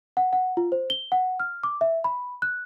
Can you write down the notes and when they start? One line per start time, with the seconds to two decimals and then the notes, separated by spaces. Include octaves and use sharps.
0.17 F#5
0.33 F#5
0.57 F4
0.72 C5
0.90 G7
1.12 F#5
1.40 F6
1.63 D6
1.81 E5
2.04 B5
2.42 F#6